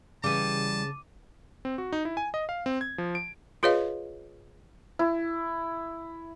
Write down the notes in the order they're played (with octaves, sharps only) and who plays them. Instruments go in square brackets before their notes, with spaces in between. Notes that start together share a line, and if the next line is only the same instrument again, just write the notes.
[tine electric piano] C#3 [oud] E3 G3 [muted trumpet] A5 [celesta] D6 D#7
[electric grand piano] C4
F#4
D#4
E4
G#5
D#5
F5
C4
G#6
F3
D7
[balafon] F4 G#4 B4 C#5 D#5 F5
[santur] E4